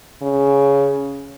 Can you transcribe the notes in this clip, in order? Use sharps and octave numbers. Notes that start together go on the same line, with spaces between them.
C#3